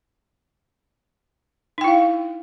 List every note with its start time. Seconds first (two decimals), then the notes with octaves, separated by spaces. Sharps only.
1.78 D#4
1.81 G5
1.84 E4
1.88 F5